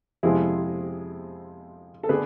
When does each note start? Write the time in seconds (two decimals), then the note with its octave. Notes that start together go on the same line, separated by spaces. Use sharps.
0.23 F2 C3 G#3 C4 E4 G#4
2.03 A4
2.09 D3 A3 D4 G#4 B4